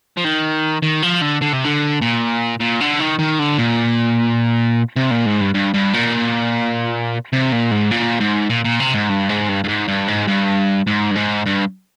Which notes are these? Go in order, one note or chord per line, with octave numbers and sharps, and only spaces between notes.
F3
D#3
D#3
F3
D3
D3
C3
D3
A#2
A#2
D3
D#3
D#3
D3
A#2
C3
A#2
G#2
G2
G2
G2
A#2
C3
A#2
G#2
A#2
G#2
A#2
A#2
C3
G#2
G2
G#2
G2
G2
G#2
G2
G#2
G2
G#2
G2
G#2
G2